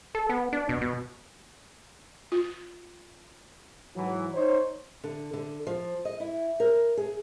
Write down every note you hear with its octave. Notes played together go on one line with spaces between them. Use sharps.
A4
B3
D4
B2
B2
F4
G#2 E3 F#3
D#4 C5 C#5
D3
D3
F3
D#5
E4
A#4
G#4